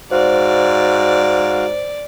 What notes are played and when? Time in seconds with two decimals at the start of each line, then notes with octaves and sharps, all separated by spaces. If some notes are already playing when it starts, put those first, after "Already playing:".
0.11 G#2 F#4 C5 D5 F5